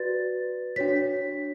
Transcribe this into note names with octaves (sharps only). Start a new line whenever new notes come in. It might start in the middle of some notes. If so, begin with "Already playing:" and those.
Already playing: F#4 B4 D5 A6
D4 F#4 C#5 B6